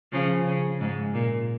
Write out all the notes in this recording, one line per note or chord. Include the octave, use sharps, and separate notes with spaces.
C#3 F3
C#3
G#2
A#2